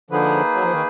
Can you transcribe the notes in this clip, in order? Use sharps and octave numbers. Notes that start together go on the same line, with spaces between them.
D3 F3 A#3 D#4 G#4 B4
F#3
F3
D#3